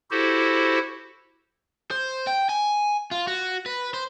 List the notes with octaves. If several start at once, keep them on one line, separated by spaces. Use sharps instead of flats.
E4 F#4 G4 A4 C5
C5
G5
G#5
F4
F#4
B4
C5